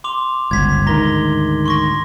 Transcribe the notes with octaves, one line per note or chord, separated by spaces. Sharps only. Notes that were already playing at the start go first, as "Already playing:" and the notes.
C6 D6 F7
G1 C#2 G#6 B6
D2 G#2 D#3 A#5 A#6 G7
C6 C#6 A#6